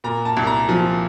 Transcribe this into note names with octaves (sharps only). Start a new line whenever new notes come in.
A#2 A#5
A5
C2
A#5
F3